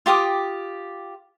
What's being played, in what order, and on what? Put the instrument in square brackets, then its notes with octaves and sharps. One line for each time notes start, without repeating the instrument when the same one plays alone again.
[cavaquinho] F4 G4 D6 D#6